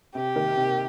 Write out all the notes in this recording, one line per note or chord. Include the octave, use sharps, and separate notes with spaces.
C3 G4
D#3 A#3
C3